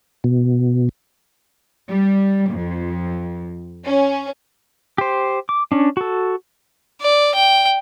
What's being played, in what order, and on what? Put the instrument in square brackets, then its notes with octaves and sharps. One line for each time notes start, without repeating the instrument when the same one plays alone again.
[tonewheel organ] B2
[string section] G3
F2
C#4
[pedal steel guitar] G4 C5
D6
C#4 D4
F#4 A4
[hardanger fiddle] D5
G5